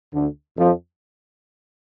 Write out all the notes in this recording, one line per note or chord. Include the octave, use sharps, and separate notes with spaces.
D2 D3
F2 F3